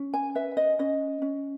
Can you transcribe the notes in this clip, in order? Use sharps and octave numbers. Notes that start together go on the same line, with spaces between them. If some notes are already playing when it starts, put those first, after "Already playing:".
Already playing: C#4
G#5
B4 E5
D#5
C#4 D#5
C#4